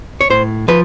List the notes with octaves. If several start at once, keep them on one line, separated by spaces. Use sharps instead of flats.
C#5
A2 C5
F3 B4